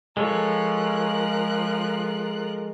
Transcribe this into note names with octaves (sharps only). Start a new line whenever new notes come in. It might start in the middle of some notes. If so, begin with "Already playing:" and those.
F3 G#3 A4 A#4 C#5 F#6